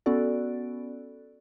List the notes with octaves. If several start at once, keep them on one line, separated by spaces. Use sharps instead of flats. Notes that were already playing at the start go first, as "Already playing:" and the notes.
B3 C#4 F#4 A4 D5